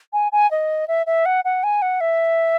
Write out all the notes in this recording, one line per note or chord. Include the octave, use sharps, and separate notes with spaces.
G#5
G#5
D#5
E5
E5
F#5
F#5
G#5
F#5
E5